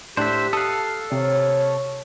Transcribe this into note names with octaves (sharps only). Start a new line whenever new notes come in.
A2 D4 G4 C5 E5 F#6
A4 F5 D#6 F#6
C3 C#5